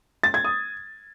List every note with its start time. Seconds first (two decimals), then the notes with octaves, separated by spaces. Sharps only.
0.24 A6
0.34 G#6
0.44 D#6